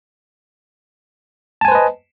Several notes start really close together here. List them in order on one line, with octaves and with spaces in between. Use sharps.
A5 G#5 C5 B4 D#5